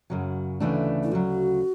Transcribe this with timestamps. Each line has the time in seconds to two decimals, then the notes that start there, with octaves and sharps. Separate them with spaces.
0.10 F#2 C#3 F#3
0.60 D2 C#3 E3 A3 D4
1.03 E4
1.12 D2 C#3 F#3 F#4